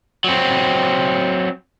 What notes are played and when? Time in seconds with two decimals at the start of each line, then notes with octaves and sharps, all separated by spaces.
0.24 F#3 C4